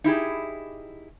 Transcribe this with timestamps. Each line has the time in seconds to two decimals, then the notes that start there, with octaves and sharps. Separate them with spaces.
0.04 D#4 E4 G4 G#4